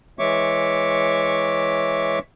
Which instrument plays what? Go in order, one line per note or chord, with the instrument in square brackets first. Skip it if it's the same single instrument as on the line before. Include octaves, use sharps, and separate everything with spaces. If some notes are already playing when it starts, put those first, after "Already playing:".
[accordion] E3 G#3 C#5 E5 C#6 D6